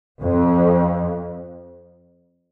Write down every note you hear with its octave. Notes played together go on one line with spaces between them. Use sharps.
F2